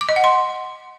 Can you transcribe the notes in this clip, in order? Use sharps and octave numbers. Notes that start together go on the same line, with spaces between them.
D6
D#5
F#5
C6